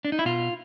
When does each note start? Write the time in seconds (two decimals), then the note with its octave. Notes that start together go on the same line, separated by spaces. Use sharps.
0.05 D4
0.12 D#4
0.19 E4
0.25 B2 F4